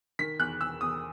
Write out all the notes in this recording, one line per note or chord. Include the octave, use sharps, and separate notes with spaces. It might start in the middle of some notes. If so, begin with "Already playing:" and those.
D#3 B6
E2 F#6
E2 E6
E2 D#6